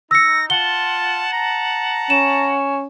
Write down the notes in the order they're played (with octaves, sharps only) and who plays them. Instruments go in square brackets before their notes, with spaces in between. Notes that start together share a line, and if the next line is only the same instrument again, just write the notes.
[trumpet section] D#4 [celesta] E6 C#7 [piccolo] A#6
[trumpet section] F4 A5 [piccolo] F#5 [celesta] G7
[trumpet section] A5 A#5
[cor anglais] C#4 [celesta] E7